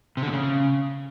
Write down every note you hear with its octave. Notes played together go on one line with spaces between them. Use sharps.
C3
D3
A#2
C#3